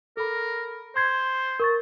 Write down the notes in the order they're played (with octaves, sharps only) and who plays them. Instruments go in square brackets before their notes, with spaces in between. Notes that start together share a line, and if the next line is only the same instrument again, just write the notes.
[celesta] A4 B5 [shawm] A#4
[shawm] C5 [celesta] C6 G#6 C7
[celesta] A#4 C#6 A6